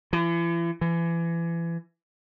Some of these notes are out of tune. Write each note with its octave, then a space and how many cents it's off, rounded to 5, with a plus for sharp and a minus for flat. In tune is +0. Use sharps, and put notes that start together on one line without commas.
E3 +40
E3 +30